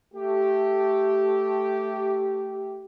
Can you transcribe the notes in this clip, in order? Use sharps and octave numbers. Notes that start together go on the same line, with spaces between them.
A3 G4